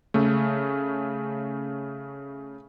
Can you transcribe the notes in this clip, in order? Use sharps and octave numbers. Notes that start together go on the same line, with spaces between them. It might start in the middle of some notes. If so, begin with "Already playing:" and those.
C#3 A3